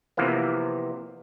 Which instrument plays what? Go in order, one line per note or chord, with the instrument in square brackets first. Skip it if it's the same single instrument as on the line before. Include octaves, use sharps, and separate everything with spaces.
[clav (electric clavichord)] C3 E3 F3 A#3 B3